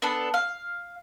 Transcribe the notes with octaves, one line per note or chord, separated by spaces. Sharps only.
B3 D4 A4
F5